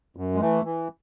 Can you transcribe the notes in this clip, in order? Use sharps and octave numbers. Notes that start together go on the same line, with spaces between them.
F#2
G#3
E3 A3
E3